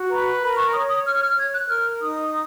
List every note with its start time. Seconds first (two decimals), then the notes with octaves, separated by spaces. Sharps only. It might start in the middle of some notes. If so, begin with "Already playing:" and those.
Already playing: F#4
0.09 B4 A#5
0.41 A#4 B5
0.57 C#6
0.72 C#5 D#6
0.89 D#6
1.04 C#5 F6
1.21 F6
1.36 C#5 G#6
1.53 F#6
1.68 A#4 F6
2.00 D#4 D#6